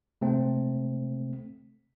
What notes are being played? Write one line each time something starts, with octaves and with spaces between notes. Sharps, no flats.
C3 A3 C4